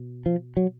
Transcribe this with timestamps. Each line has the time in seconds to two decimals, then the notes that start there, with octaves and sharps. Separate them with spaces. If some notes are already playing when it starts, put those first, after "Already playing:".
Already playing: B2
0.26 F3
0.57 F#3